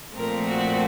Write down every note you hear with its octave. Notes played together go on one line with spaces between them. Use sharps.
A#2 F3 A3 C4 A#4
F#4